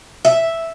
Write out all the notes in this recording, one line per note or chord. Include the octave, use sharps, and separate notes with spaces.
E5